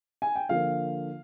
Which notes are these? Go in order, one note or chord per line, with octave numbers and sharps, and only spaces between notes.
G#5
G5
D3 F3 A#3 F5